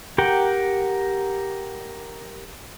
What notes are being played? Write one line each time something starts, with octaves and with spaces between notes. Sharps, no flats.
G4 A#4 F#5 G5